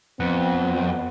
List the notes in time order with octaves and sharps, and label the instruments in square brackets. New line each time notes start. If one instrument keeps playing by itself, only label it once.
[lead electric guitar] F2 [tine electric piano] B3 F#5 [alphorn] C4